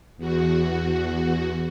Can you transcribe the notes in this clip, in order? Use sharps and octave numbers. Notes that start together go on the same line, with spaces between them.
E2 F#4